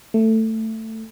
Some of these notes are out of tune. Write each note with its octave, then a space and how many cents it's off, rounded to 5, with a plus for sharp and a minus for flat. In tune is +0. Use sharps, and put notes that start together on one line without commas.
A3 +15